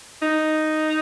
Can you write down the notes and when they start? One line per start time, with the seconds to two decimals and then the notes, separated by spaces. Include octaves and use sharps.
0.22 D#4